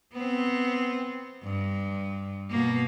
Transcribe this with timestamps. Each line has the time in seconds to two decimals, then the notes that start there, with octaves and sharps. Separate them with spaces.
0.13 B3 C4
1.43 G2
2.50 B2 A#3